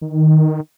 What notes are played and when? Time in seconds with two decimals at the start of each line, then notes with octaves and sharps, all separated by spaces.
0.02 D#3